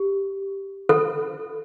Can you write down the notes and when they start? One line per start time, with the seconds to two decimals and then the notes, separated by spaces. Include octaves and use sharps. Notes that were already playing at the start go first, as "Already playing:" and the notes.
Already playing: G4
0.89 A4